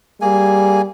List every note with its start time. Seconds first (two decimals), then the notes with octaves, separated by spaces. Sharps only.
0.22 G3 A#3 G#4 G#5